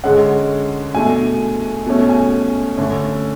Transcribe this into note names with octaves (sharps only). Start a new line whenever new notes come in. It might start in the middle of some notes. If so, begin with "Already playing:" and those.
D3 G#3 C#4 F#5
B2 A3 D4 G#5
B2 A3 C#4
G#5
D3 A3 C#4